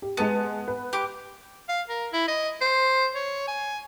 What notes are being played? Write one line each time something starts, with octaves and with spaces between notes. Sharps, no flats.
G4
G#3 B3 A5 C#7
B4
G4 D6
F5
A#4
E4
D#5
C5
C#5
G#5